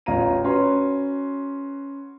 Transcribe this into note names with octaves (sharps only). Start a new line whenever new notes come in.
A1 F4 C#5 A#5 D#7
C#4 F#4 B4 A#5 C6